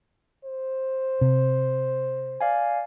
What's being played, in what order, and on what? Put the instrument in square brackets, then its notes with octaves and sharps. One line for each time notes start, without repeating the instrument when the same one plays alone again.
[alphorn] C5
[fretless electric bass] C3
[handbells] D5 F5 G#5